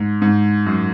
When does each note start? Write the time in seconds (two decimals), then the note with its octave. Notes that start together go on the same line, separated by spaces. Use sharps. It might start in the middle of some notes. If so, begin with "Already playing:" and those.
Already playing: G#2
0.22 G#2
0.66 F#2